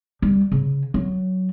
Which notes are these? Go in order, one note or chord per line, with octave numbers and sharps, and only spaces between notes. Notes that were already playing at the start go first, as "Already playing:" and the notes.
G3
C#3
F#3